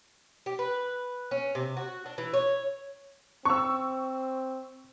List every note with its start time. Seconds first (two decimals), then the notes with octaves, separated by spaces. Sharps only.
0.46 G4
0.59 B4
1.31 C#4
1.55 C3
1.77 F#4
2.06 D4
2.18 E3
2.33 C#5
3.45 C4 C#6 E6